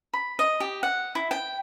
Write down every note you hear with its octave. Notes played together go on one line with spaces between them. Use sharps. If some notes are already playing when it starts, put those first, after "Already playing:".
B5
D#5
G4
F#5
E4
G5